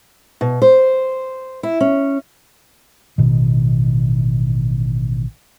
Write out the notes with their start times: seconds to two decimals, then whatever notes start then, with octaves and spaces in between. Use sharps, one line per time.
0.41 B2
0.62 C5
1.63 E4
1.80 C#4
3.18 A1 B2 D#3